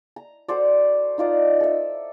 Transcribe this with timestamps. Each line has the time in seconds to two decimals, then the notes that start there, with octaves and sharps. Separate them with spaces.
0.16 A#5
0.48 F#4 A4 C5 D5
1.18 D#4 F4 D5 A#5
1.60 A4 E5